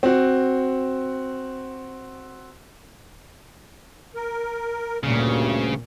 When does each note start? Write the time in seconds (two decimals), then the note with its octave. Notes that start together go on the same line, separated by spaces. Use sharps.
0.03 C4 F#4
4.16 A#4
5.03 D2 G2 A#2 C#3